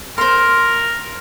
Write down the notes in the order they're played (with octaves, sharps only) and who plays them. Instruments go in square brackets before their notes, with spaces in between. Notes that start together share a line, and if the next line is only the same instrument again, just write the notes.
[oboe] A#4 [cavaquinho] C5 C6